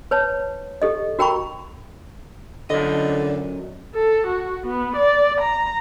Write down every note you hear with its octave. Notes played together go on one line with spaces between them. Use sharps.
B4 C#5 A5
G4 A4 D#5
F#4 A#4 G5 A#5 B5 C#6
F#2 D3 D#5
A4
F#4
B3
D5
A#5